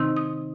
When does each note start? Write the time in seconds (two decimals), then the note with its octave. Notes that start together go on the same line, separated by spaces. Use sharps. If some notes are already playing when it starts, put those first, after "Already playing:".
Already playing: C3 D#3 C4 D#4
0.17 D#6